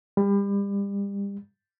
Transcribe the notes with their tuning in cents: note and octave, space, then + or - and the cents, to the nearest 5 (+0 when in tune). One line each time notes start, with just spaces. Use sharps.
G3 +30